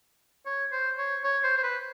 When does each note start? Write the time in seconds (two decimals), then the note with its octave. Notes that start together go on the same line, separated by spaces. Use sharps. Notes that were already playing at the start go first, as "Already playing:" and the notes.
0.46 C#5
0.72 C5
0.98 C#5
1.24 C#5
1.43 C5
1.57 C5
1.63 B4